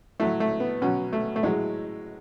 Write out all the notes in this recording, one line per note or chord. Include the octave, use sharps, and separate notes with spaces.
A2 F#3 A3
A3
B3
B2 F#3 C#4
A3
A3
A2 F#3 G#3